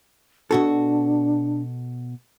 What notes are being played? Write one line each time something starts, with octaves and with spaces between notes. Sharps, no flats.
B2 D4 F#4 A4